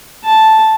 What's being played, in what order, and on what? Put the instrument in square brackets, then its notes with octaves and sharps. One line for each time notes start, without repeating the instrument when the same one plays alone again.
[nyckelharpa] A5